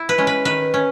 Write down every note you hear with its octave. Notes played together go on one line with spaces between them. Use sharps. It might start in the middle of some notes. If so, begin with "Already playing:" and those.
Already playing: E4
B4
G#3 C#4
B4
D#3 B4
C#4